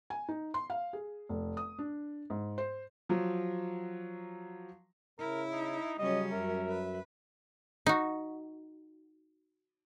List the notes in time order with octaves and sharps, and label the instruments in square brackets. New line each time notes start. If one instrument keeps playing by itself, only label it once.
[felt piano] G#5
D#4
C6
F5
G#4
F1
D#6
D4
G#2
C5
[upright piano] F3 F#3
[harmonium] C#3 [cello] E4 [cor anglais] A#4
[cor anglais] D#4
[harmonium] C#3 F#3 [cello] G3 C#4 [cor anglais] D#5
[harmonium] F#2 E5 [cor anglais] A#4
[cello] B4
[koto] D#4 F#4